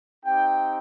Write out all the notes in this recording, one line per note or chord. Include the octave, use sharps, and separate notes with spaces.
C4 D#4 G4 G5